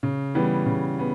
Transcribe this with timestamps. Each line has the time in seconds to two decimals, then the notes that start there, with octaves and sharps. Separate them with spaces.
0.03 C#3
0.35 E3 G3 B3
0.66 C#3
0.99 B3